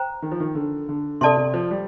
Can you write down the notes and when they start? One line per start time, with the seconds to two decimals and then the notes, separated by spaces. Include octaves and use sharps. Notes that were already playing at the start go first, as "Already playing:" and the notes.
Already playing: C5 G5 A#5
0.22 D#3
0.31 F3
0.40 D#3
0.55 D3
0.89 D3
1.21 C3 A4 D5 A5 C6
1.37 C3
1.54 F3
1.71 G3